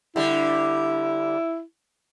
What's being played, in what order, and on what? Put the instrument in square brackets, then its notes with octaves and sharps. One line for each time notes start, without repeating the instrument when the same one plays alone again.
[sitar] D3 G3 [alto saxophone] E4